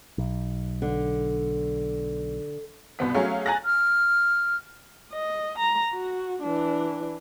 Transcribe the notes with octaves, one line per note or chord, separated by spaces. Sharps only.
B1
D3
C2 B2 B3 B6
F#3 A3 C#4 G#4 C#5 F5
G#5 A#5 F#6 A6 A#6
F6
D#5
A#5
F#4
E3 D4